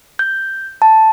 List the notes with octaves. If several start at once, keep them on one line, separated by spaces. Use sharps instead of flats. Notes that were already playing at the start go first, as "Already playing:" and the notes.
G6
A5